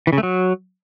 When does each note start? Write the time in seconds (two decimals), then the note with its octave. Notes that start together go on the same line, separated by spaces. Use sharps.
0.07 E3
0.13 C#3
0.18 A3
0.23 F#3